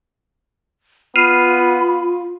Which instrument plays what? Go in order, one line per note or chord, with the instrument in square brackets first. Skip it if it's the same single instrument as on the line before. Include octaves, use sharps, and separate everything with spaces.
[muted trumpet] B3 [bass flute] F4 [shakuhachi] B5 [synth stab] F6 C7 D#7